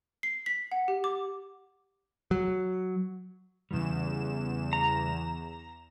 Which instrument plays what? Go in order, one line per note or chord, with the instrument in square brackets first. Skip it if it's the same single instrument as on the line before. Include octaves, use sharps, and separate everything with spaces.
[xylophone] C7
B6
F#5
G4
D6
[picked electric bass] F#3
[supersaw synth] E2 E7 [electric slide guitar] C#3 G3
[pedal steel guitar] A#5